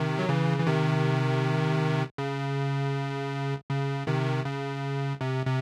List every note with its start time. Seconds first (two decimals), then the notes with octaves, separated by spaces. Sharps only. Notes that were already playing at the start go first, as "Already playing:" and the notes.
Already playing: C3 D#3
0.18 F#3
0.29 C#3 E3
0.59 E3
0.67 C3 D#3
2.18 C#3
3.69 C#3
4.07 C3 D#3
4.45 C#3
5.21 C3
5.46 C3